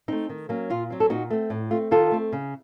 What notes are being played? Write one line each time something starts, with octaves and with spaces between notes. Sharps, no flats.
A3 C4 D#4
D#3
F#3 A#3 C#4
A#2 F4
F#3 C4
A4
A#2 D#4 F#4
A3 C4
A2
A3 C4 F4
D#3 F4 A4
A3 C4
C#3